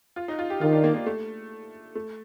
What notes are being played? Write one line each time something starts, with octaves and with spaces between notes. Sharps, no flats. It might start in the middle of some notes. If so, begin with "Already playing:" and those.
F4
D#4
F4
G4
D#3 F4
D4
A#3
A#3
A3
A3